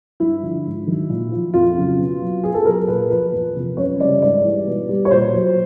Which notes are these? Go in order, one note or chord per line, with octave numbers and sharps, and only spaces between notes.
G2 E4
D3 F3
G#2
D#3 F#3
A#2
F3
F2 F4
C#3 F#3
B2
F#3
B2 G#4
A4
F#3 A#4
A#2 B4
F3 B4
E2
C3 F3
F#2 C#5
C#3 E3 G3 D5
G#2 D5
E3 G3
B2
G3
C#5
A#2 C5
F#3